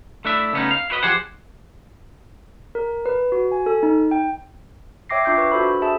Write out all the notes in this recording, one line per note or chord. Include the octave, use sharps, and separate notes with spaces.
A3 D4 E4 E5
C#3 A3 B3 C#4 D#4
F5
E4 F#4 B4 D#5
F3 G4 G#4 C5 F#5
A#4
B4
F#4
G#5
A4
D#4
G5
C#5 E5 G5 D6 A#6 C7
D4 F4 E5 D6 G6 C7
B4 C#6
D4 F#4 A4 C5 B5
G#4 E5 A5